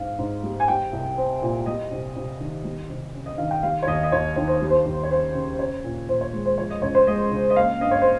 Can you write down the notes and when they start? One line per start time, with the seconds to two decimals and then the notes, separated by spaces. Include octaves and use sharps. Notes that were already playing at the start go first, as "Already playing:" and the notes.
Already playing: G#2 C4 F5
0.19 G#2
0.43 G3
0.60 G#5
0.68 G3 G5
0.93 C2
1.18 C4
1.42 A#2
1.66 G3 D#5
1.91 C3
2.16 C3
2.40 D#3
2.65 G3
2.90 C3
3.14 C#4
3.26 D#5
3.38 D#3 F5
3.51 G5
3.63 G3 F5
3.83 C#5
3.87 D#2 D#5
4.03 D#5
4.12 D#2 C#5
4.36 D#3 C#5
4.47 C5
4.62 G3
4.70 C5
4.86 D#2
5.03 C#5
5.10 C#4 C5
5.34 C#3
5.59 C#4 C#5
5.84 A#2
6.09 A#2 C5
6.21 C#5
6.33 G#3
6.46 C5
6.58 F3 C#5
6.70 D#5
6.82 C#2 C#5
6.95 C5
7.07 G#3 D#5
7.31 C#3
7.50 D#5
7.56 A#3 F5
7.81 G2 D#5
7.91 C#5
8.02 C5